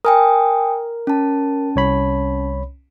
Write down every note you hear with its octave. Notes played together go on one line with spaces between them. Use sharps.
A#4 G5 G#5 D#6
C#4 A5
C2 C#5 B5